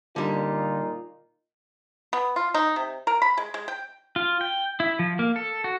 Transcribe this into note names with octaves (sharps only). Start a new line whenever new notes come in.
A#2 D3 G3 D#4 F4
B3
F4
D#4
C3
A#4
B5
G#3
G#3
G5
F4
G5
E4
F3
A#3
A4
F#4